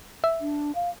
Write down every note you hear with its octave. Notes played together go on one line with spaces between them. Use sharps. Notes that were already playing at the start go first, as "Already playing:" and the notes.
E5
D4
F5